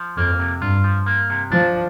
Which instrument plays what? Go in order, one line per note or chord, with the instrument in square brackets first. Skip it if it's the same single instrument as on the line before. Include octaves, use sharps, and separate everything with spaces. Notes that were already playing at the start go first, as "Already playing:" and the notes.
Already playing: [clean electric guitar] F3
[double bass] F2 [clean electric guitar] A#3
[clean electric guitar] C3
[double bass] G2 [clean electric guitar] F4
[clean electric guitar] F3
A#3
C3
[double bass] F3 [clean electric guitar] D4